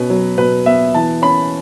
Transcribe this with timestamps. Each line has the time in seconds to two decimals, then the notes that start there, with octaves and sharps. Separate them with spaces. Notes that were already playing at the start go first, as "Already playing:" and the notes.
Already playing: B2 C#4 B4
0.10 F#3
0.38 B2 B4
0.66 B3 E5
0.94 E3 A5
1.22 C#4 B5